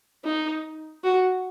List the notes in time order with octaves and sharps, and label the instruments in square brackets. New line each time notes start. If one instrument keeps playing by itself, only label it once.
[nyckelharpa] D#4
F#4